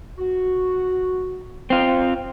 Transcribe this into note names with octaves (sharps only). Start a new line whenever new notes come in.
F#4
C4 F4